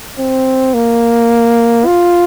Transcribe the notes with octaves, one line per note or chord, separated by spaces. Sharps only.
C4
A#3
F4